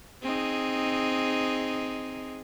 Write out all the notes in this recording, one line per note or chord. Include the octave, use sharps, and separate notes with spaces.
C4 D#4 G#4